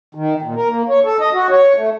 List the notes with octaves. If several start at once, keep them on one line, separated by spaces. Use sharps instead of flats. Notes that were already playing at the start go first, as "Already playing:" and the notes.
D#3
A#2
A#4
A#3
C#5
A4
D#5
F#4
C#5
A3